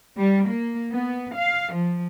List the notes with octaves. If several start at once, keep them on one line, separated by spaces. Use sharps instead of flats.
G3
A#3
B3
F5
F3